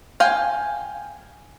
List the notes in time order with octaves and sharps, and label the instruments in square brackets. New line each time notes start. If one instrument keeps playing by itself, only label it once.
[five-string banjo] F5 G5 G#5